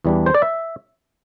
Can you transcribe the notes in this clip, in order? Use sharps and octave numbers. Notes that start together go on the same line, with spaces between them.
E2 E3 G3 D4
C5
D5
E5